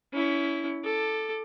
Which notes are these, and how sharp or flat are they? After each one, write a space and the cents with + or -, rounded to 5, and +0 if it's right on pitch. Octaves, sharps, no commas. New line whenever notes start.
C#4 +25 E4 +0
A4 +0 D6 +20